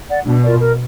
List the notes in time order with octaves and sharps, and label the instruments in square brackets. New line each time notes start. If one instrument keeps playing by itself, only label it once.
[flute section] D5 F#5
[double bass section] B2 [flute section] D4
[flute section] F4 A#4 D5
A#4